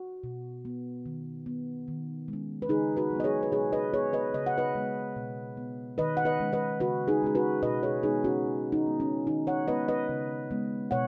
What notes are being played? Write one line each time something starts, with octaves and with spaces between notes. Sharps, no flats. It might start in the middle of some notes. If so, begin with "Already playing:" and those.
Already playing: F#4
B2
B3
D#3
B3
D#3
G#3 C#4
B4
C#3 D#4 G#4
F#4 B4
F#3
B3 D#5
G#4 C#5
B4
B2 G#4 C#5
B4 D#5
B3 G#4 C#5
B4 D#5
C#3 D#5
F#5
B4 D#5
G#3 B3
B2
B3
D#3 B4 D#5
F#5
B4 D#5
G#3 C#4
B4 D#5
C#3 F#4 B4
D#4 G#4
G#3 C#4 G#4
F#4 B4
B2 B4 D#5
G#4 C#5
G#3 B3 D#4 G#4
C#4 F#4
B2
D#4
G#3 B3
C#4
D#3 D#4
C#5 F#5
G#3 B3 B4 D#5
B4 D#5
C#3
G#3 B3
B2 C#5 F#5